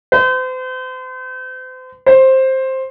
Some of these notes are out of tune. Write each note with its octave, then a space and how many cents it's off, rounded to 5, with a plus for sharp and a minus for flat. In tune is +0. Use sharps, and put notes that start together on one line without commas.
C5 -40
C5 +10